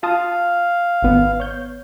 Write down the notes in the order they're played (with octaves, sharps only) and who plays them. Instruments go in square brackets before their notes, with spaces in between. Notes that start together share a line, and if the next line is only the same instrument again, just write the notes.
[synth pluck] F4 A5 D#6 [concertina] F5
[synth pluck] G#1 B3
C#5 G6